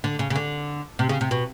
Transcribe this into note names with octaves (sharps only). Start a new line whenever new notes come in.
D3
C#3
C#3
D3
C3
C#3
C3
B2